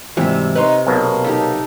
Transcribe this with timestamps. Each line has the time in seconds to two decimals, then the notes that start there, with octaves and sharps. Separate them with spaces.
0.17 G#2 C3 E3 F#3 G3 E5
0.56 D#4 B4 C#5 C6
0.87 B1 B2 A#3
1.24 D#4 G4 A4